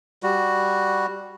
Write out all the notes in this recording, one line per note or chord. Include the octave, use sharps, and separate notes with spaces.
G3 F#4